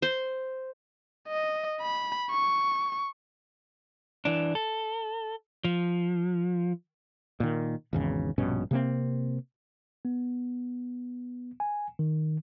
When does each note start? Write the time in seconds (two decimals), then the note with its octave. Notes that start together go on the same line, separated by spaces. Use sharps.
0.02 C5
1.28 D#5
1.81 B5
2.30 C#6
4.25 E3 D4
4.55 A4
5.64 F3
7.40 A#2 D#3
7.93 G#1 E2 C#3
8.38 A#1 G2 B2 C#4
8.71 C3 A#3 C4
10.05 B3
11.60 G#5
11.99 D#3